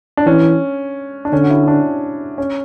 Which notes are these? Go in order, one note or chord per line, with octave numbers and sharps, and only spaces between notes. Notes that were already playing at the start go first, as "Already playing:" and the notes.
D4
E3 C#4
D4
D3 C#4
F#4
E4
D4
C#4